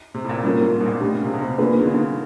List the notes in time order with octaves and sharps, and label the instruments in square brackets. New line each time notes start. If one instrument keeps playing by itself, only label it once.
[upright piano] C3
A2
A#2
[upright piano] A2 [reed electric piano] G3 A#3 C#4 F4 A#4
[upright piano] G#2
B2
A#2
[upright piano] B2 [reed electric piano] A3 D4 G4
[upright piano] C#3
C3
B2
C3
[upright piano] D3 [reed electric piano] A#3 D4 F4 G#4 B4
[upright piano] D#3
D3
C#3
D3